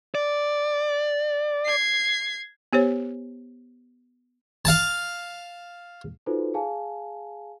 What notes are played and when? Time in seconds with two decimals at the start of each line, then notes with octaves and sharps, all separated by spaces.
0.15 D5
1.65 G#6 C7
2.73 B3 G4 C5 C#5
4.65 F5 A5
6.26 D#4 F4 F#4 A4 B4 C5
6.54 G#4 F5 G#5 A5